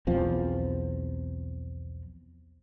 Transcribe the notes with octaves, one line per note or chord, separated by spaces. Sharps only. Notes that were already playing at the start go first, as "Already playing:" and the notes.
B1 E2 F3 C4